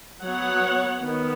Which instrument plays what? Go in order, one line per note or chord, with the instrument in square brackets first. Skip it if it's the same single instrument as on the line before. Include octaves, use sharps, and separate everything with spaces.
[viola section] F#3 B3 C#5 F#5
D#3 B3